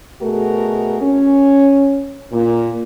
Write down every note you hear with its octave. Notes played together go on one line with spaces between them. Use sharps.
B2 A3 F#4 G#4 A#4
C#4
A#2